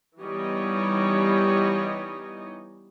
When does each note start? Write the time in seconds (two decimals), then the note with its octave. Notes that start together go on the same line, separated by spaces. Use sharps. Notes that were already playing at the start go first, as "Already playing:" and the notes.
0.21 E3 G3 B3 D#4 C#5 D#5